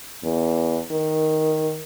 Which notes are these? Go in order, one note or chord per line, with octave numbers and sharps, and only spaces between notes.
E2
D#3